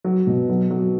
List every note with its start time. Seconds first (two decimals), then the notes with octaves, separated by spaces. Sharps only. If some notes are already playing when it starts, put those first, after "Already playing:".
0.04 F#3
0.27 B2
0.49 F#3
0.70 F#3